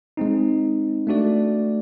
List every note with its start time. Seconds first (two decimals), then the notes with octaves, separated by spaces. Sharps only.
0.17 G#3 C4 D#4
1.07 A3 D4 F#4 A4 D5